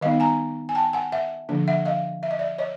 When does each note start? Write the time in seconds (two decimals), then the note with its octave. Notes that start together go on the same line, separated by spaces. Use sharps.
0.01 D#3 G3 B3 D#4 D#5 F5
0.20 G#5 A#5
0.69 G#5
0.75 G5 A5
0.93 F#5 G#5
1.12 E5 F#5
1.49 D3 F3 A#3 D4
1.68 E5 F#5
1.85 D#5 F5
2.23 E5
2.31 D#5
2.39 D5 E5
2.58 C#5 D#5